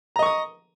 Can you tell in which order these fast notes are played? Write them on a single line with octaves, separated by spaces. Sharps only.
A#5 D#5 C#6 D#6